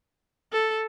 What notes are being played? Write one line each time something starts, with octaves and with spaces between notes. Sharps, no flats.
A4